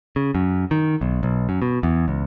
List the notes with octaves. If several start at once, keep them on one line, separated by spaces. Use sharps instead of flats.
C#3
F#2
D#3
B1
B1
F#2
B2
E2
C#2